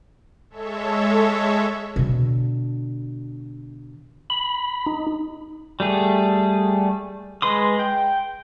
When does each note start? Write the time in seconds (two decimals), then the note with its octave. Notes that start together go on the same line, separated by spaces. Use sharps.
0.50 G#3 A4 C#5 E5
1.96 B2 D3
4.30 B5
4.86 D#4
5.80 G3 A3 G#4
7.42 G#3 B4 C6 D#6
7.79 G5